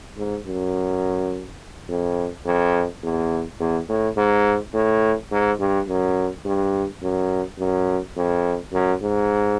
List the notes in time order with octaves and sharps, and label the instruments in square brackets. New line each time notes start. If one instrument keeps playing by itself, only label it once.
[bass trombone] G#2
F#2
F2
F2
E2
E2
A2
G#2
A2
G#2
G2
F#2
G2
F#2
F#2
F2
F#2
G#2